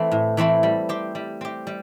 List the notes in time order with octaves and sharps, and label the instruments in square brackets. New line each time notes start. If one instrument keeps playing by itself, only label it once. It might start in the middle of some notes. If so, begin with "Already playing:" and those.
Already playing: [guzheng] E3 A3 C4 E4
A2
E3 A3 C4 E4
G3
C4 G4
G3
C4 G4
G3